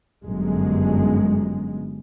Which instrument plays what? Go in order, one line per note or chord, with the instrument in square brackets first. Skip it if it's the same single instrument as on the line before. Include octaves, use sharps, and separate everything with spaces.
[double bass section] G1 F#2 G#3